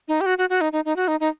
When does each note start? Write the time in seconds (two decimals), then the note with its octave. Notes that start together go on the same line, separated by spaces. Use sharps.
0.08 D#4
0.21 G4
0.26 F#4
0.38 F#4
0.50 F#4
0.61 D#4
0.73 D#4
0.85 D#4
0.96 F#4
1.08 D#4
1.20 D#4